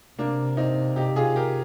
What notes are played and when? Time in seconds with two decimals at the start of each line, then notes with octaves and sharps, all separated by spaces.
0.18 C3 A#3 D4
0.57 C4 D#4
0.96 D#4 G4
1.16 F4 G#4
1.36 G4 A#4